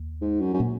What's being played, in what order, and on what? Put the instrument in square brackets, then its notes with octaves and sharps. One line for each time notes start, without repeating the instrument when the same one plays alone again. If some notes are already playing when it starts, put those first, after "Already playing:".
Already playing: [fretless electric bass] D#2
[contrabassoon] G#2
F#2
F#2
[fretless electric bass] A#2 A#3 C#4